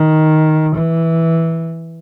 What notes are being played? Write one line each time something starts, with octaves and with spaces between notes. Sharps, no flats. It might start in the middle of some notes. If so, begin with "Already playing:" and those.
Already playing: D#3
E3